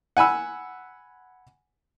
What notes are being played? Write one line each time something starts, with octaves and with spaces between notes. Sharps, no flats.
F#5 G#5 B5 E6